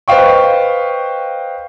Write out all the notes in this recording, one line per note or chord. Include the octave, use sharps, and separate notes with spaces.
B4 C5 D#5 F5 G5 C#6